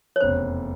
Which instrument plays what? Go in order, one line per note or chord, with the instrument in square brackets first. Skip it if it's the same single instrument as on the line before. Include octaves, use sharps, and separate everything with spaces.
[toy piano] C#5
[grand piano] F1 E2 C#3 [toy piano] C5